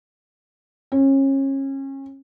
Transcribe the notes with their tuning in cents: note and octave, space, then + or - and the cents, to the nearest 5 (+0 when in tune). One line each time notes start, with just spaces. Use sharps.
C#4 -30